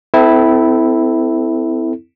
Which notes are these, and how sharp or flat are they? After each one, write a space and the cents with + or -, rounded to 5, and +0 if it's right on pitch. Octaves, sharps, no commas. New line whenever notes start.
C4 -35 E4 -10 A4 +0